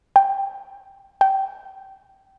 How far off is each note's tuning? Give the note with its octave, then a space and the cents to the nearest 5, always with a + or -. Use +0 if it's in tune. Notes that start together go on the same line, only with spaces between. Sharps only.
G5 +0
G5 -20